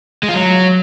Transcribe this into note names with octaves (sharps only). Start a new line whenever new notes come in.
G#3
F4
F#3